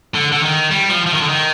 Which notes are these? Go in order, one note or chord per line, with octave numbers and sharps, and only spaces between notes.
D3
D3
D#3
G3
F3
F3
D#3
D3
D#3